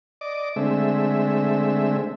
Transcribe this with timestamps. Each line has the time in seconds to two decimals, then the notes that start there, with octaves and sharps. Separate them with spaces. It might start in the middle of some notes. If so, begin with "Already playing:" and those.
0.21 D5 D#5 D6
0.56 D3 G#3 A3 C4 E5